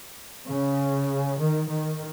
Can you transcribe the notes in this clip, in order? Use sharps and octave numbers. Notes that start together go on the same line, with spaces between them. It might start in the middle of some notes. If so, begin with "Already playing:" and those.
C#3
D#3
D#3